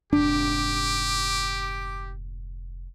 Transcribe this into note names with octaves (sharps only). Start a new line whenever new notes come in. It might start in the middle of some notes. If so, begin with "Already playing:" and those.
F1 G#2 D4 G4 D6